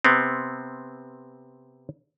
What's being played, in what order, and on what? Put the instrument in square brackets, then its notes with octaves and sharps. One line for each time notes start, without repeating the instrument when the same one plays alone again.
[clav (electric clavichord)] C3 B3 C4